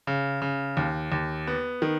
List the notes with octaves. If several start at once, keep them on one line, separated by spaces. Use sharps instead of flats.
C#3
C#3
D#2
D#2
B3
D#3